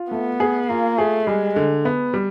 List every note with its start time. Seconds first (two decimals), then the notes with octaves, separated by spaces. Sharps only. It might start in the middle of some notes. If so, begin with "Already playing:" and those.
Already playing: F4
0.11 A3 B3
0.40 G#4
0.69 A#3 F4
0.98 A3 G#4
1.27 G3 G#3
1.56 D3
1.85 B3
2.14 G3